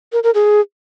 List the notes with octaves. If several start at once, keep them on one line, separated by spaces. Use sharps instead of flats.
A#4
A#4
G#4